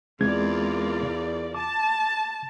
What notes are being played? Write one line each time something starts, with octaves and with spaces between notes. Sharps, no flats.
E2 G#3 C4 F4 A#4 D5 G#6
A5 D6